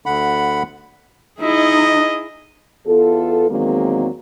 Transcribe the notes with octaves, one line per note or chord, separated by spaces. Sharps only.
D2 D3 F#5 B5
D#4 E4 G#4 D#5
E2 B3 F4 A4
E2 D#3 F#3 G#3 A#3 C4